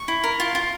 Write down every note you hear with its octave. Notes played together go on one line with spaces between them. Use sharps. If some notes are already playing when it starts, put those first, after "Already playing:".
Already playing: C#6
E4
A#4
F4
F4